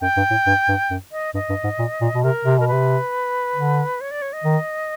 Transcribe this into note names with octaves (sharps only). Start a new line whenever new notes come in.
F#2 G5
G2
A2
G2
G2
F#2
D#5
G2 D#5
G2
G#2
A#2
A#2
B2
C3 A#4
C3
B2 A#4
C3 B4
D3
C#5
D5
C#5
D#5
D#3